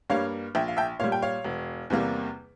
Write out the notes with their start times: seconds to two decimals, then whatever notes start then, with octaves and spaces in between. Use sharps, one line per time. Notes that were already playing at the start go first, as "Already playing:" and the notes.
0.10 G2 G3 A#3 C#5 F5
0.55 A#1 E5 G5
0.68 F5
0.77 E5 G5
1.00 A#2 G3 C#5 F5
1.12 G5
1.22 C#5 F5
1.44 E1
1.90 E2 C3 G3 A#3